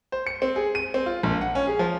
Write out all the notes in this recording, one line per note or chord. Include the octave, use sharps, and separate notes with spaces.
C5
C#7
C4
G#4
D#7
C4
F4
A#1
F#5
C#4
G#4
F3